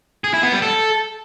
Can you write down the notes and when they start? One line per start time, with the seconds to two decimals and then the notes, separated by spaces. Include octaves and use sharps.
0.24 G#4
0.34 E4
0.43 B3
0.53 G3
0.62 A4